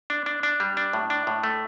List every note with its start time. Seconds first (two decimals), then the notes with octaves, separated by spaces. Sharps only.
0.10 D4
0.26 D4
0.43 D4
0.60 G3
0.77 D4
0.93 A2
1.10 D4
1.27 A2
1.44 A3